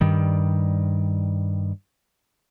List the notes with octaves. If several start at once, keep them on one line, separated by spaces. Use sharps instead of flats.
G2 D#3 G3